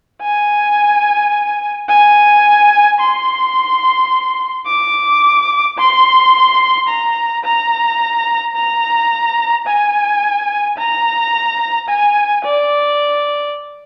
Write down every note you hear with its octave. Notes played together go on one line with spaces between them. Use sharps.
G#5
G#5
C6
D6
C6
A#5
A#5
A#5
G#5
A#5
G#5
D5